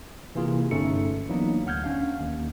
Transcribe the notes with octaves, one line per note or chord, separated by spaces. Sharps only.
C3 E3 A#3 F4 G#4
G1 A3 C#4 D#4 A4 C#7
E3 F#3 A#3 B3 D4 D#4
D2 F#5 F6 G6 G#6
C#4 D4 F5
D#2